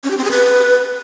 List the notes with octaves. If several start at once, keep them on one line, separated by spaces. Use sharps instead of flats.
C#4
G4
C4
G#4
B4